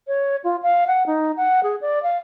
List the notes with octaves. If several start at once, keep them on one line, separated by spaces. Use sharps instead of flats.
C#5
F4
F5
F#5
D#4
F#5
G#4
D5
F5